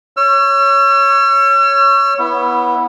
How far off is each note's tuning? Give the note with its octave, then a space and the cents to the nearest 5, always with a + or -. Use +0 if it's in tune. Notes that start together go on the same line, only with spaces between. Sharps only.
C#5 +0 E6 +45
B3 -15 E4 +0